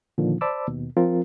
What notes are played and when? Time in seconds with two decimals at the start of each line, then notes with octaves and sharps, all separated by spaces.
0.18 A#2 D3 D#3 F3
0.41 C5 D5 A5 B5 D6 E6
0.68 D#2 B2
0.97 F3 C4 F4 A#4